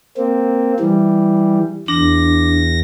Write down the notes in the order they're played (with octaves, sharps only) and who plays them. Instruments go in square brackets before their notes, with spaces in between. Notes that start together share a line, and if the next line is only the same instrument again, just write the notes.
[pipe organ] A#3 C4
E3 G3
[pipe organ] E2 A#6 [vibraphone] D4